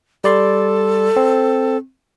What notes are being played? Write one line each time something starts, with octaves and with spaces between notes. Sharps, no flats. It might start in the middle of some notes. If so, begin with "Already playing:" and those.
G3 A4 D5 C6
C4